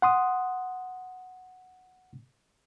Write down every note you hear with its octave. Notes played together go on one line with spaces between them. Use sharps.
F#5 C6 D#6